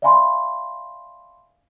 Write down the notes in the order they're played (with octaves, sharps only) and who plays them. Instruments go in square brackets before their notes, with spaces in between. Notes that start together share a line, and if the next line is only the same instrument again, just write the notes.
[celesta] D5 E5 F5 G#5 B5 C6